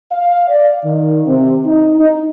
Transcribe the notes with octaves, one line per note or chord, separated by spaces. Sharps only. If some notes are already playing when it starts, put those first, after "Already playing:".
F5
D5
D#3
C3
D#4
D#4